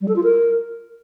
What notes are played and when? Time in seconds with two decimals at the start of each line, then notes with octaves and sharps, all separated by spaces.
0.01 G3
0.08 A4
0.16 F4
0.24 A#4